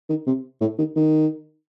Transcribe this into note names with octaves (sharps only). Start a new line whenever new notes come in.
D#3
C3
A2
D#3
D#3